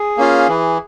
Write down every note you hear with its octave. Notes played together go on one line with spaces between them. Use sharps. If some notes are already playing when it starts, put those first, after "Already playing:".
Already playing: G#4
A#3 C#4 F4
E3